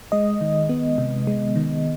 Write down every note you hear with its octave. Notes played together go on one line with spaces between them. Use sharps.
G#3 D#5
D#3
B3
C3
G#3
D#3